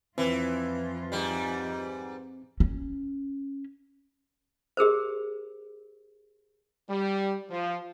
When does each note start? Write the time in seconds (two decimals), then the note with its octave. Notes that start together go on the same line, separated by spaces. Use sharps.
0.18 F2 E3 C4 F4 B4
1.12 G#2 G3
2.60 C#4
4.77 G4 G#4 A#4 C5
6.89 G3
7.50 F3